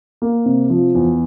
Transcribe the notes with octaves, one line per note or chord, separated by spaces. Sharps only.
A#3
C3
F3
E2